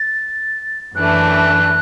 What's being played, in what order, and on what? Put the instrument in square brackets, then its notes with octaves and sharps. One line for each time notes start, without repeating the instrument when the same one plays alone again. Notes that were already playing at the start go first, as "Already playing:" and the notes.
Already playing: [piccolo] A6
[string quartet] F#2 E3 A3 D4 [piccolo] F#6